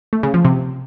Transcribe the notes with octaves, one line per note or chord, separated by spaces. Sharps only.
A3
C#3
F3
C3